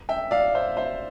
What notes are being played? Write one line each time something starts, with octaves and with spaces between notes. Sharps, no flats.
E5 G5
D5 F5
C5 E5
C5 E5